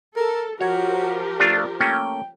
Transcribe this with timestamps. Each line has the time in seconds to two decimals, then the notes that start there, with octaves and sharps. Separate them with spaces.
0.17 A4 A#4
0.61 F3 F#4 G4 A#4 C#5
1.40 A3 D4 F4 D5
1.80 A3 A#3 C#4 G5